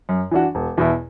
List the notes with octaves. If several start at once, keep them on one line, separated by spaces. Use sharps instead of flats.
F#2
E3 D4 F#4
E1
E2 B2 B3 E4